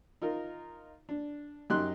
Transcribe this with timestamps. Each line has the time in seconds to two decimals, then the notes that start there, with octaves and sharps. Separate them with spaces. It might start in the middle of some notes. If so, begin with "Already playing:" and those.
0.22 D#4 F4 A#4
1.09 D4
1.70 F#2 D#4 G4 C6 F#6